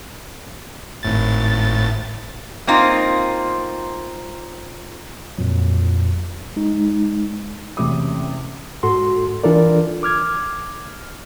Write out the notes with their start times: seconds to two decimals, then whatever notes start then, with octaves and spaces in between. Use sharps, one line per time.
1.03 G#1 A2 A6
2.67 A#3 C4 D#4 F4
5.38 A1 F2 A#2 F#3
6.56 G#3 D#4
7.77 E2 C3 A3 C#4 D6 D#6
8.83 G#2 F#4 A4 C6
9.43 E3 D4 F4 A4 A#4 D5
10.03 D6 F6 G#6